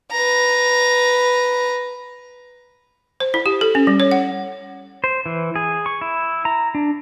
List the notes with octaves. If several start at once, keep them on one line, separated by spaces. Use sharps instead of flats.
B4 A#5
C5
E4
G4
A4
C#4
G3
C#5
F#5
C5
E3
G#4
C#6
E4
A#5
D4